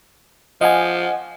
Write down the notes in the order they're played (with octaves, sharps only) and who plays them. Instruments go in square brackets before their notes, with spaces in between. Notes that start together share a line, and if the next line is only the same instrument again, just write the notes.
[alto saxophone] F3 [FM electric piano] D#5 F#5 G#5